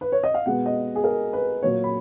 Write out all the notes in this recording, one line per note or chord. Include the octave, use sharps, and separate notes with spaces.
B4
C#5
D#5
F5
B2 G#3 B3 F#5
D#5
G#4
A#4
B4
A#2 F#3 A#3 C#5
B5